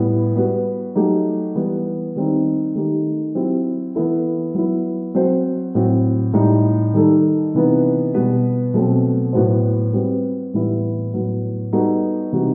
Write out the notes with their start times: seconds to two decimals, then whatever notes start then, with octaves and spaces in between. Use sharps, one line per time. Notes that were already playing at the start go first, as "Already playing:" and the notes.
Already playing: A2 G3 B3 E4
0.35 G3 B3 F#4 B4
0.95 F#3 A3 D#4 G4
1.55 E3 G3 B3
2.16 D#3 G3 C4 D#4
2.75 D#3 A3 D#4 G4
3.35 F#3 C4 E4 G4
3.95 E3 B3 E4 A4
4.54 F#3 B3 E4
5.15 F#3 C4 F#4 C5
5.75 A2 F#3 C4 F#4
6.34 A2 G3 D#4
6.93 D#3 G3 D#4 A4
7.54 C3 E3 B3 D#4
8.14 B2 G3 B3 F#4 B4
8.74 B2 F#3 A3 C4
9.33 A2 F#3 B3 F#4 C5
9.93 G3 C4 F#4 B4
10.54 A2 E3 G3 B3 E4
11.13 A2 F#3 B3
11.73 G3 B3 D#4 F#4 A4
12.32 C3 E3 G3 D#4 F#4